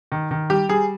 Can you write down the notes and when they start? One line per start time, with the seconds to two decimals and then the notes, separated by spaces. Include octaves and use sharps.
0.12 D#3
0.31 D#3
0.50 G3 G4
0.69 G3 G#4